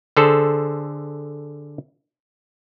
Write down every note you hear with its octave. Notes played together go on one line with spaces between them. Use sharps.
D3 G#4 A4 C5